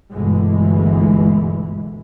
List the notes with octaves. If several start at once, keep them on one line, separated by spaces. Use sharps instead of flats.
G1 D2 G2 B2 E3 G#3